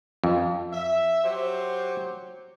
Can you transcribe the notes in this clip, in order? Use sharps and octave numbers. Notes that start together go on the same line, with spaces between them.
F2
E5
F#3 G4 C5